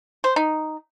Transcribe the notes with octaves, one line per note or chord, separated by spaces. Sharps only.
C5
D#4